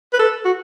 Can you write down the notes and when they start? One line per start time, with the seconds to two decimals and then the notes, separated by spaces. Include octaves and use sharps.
0.14 B4
0.20 A4
0.45 F#4